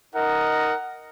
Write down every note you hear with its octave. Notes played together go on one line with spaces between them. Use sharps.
D#4 A#4 D#5 F#5